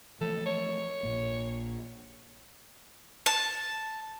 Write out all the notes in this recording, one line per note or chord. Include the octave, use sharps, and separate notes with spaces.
E3 F3 A3 A4
C#5
A#1 A#2 A#3
A5